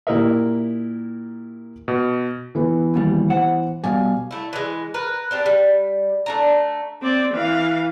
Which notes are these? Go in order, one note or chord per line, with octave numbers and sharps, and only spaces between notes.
A#2 E4 G4 A#4 D#5 E5
B2
E3 B3
D#2 B2 G3
C5 F#5
B2 G3 F5 G#5
A3 E4
E3 G#3
A#4 B4
C4 D4 G4
G3
A3 D4 A#5
C4 D5
E3 F5